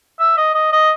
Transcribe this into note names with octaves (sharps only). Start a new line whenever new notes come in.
E5
D#5
D#5
D#5